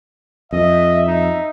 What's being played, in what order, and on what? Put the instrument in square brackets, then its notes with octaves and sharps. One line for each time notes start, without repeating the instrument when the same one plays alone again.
[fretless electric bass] F2 [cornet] D#5 [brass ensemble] E5
[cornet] D#4